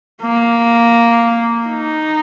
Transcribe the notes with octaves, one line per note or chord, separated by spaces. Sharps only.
A#3
D#4